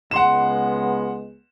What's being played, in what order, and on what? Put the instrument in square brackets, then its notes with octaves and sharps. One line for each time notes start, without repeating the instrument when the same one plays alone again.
[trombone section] C#2 G#3 B3 [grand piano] F#5 C6 E7